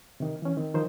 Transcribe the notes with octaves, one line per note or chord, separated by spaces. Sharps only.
C3 D#3
E3 C#4
D#3 C4
D#3 F3 C5